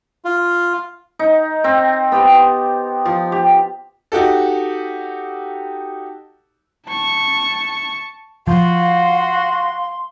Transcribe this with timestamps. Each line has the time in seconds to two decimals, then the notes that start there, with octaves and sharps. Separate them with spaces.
0.25 F4
1.19 D#4
1.64 C4
2.12 B3 G4 C5
3.06 F3
3.32 G4
4.12 D#4 F#4 G4 A4
6.87 A5 C#6
8.48 F3 F#4 F5 C6